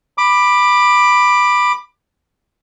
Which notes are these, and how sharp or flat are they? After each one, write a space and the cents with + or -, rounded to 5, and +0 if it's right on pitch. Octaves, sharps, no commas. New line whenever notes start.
B5 +0 D6 +20